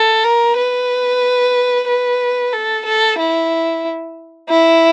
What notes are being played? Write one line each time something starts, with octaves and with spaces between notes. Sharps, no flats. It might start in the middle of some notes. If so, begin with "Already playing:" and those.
Already playing: A4
A#4
B4
B4
A4
A4
E4
E4